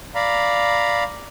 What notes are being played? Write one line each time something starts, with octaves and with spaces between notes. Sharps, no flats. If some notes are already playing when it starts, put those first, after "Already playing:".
D5 F5 A#5 B5